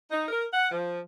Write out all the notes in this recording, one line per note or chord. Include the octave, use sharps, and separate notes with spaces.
D#4
A#4
F#5
F3